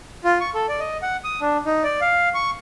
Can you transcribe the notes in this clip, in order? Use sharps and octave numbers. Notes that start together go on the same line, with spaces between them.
F4
C#6
A4
D5
D#5
F#5
D#6
D4
D#4
D5
F5
C#6